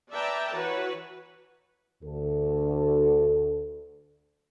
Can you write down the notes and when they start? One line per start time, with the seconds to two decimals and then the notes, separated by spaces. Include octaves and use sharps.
0.13 B4 D5 E5 G5 A5 A#5
0.54 E3 F#4 B4 C#5
2.03 D2 A4